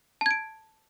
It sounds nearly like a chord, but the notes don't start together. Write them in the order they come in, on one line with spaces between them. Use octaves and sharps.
A5 G#6 D7